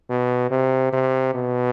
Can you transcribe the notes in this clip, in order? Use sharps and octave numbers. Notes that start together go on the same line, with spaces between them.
B2
C3
C3
B2